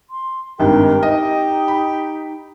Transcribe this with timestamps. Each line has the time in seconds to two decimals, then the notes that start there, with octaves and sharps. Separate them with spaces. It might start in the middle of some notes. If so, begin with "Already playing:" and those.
0.10 C6
0.60 G#1 G2 G4 A#4
1.03 D#4 D#5
1.68 B5